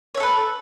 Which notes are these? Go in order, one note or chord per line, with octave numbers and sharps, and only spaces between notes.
A4 B4 C#5 E5